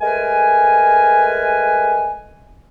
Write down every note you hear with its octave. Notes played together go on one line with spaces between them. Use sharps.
G#3 A3 A#4 B4 G#5